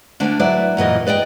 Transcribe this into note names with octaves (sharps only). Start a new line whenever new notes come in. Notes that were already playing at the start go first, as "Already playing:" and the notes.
D2 D4
F#3 E4 B4 D5
F#2 A#2 E3 D#5
B4 D5 D#5 G5